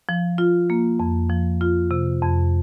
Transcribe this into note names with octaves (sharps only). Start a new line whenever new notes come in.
F3
F4
A#3
F2
F3
F4
C3
F2